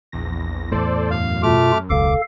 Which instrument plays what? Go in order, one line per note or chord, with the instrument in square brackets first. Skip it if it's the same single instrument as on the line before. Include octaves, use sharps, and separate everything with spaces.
[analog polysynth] A#1 E2 A#6
[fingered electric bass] E2 A2 [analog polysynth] A4 C5 D5
[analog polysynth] F#2 [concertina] F5
[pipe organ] B2 F4 [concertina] A3 D6 F6
[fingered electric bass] E1 C#2 [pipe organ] A4 F5 [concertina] D6